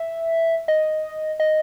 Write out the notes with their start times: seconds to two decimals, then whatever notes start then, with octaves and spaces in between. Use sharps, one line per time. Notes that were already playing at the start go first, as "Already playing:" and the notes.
Already playing: E5
0.68 D#5
1.40 D#5